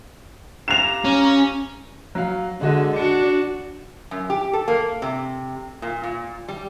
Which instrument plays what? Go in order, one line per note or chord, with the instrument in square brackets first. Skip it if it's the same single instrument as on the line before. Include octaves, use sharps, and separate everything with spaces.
[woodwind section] F4 G4 A#5 [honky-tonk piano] E7 F7
[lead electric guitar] C#4
[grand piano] F#3 F5
[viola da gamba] D3 [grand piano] G#3 F#4 D#5
[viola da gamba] D4 F#4 [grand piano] C#7
[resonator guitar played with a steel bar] F#2
G4
A4
A#3
C3
A#2
A#2
G3